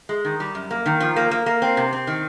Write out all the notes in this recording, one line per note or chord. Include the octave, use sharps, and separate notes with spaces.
G#3
D#3
G3
F#2
A#3
D#3
F3
A#3
A#3
A#3
C4
C3
C4
D#3